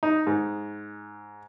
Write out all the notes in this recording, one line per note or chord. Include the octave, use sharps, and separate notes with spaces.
D#4
G#2